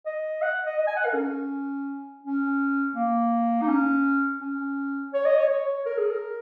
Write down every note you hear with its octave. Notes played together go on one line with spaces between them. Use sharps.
D#5
F#5
D#5
D#5
G#5
F#5
A#4
C#4
C#4
A#3
D#4
C#4
C#4
C#5
D#5
C#5
C#5
A#4
G#4
A#4